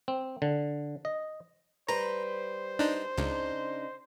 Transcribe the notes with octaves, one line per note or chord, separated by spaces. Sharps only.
C4
D3
D#5
G3 B4 C5 A#5
D4 D#4
C#2 C#3 D4 D#4